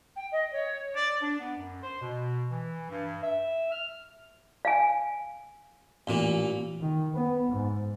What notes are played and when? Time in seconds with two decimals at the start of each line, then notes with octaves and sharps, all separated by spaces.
0.15 G5
0.31 D#5
0.52 C#5
0.96 D5
1.22 D4
1.40 B3
1.58 F#2
1.83 C5
2.02 B2
2.51 E3
2.90 G2
3.23 E5
3.72 F6
4.65 F5 G#5
6.07 A1 A#2 A#3
6.81 D#3
7.14 B3
7.52 G#2